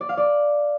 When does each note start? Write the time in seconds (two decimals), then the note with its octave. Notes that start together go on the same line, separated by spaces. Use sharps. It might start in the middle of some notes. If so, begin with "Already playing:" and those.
0.01 D5
0.09 F5
0.17 D5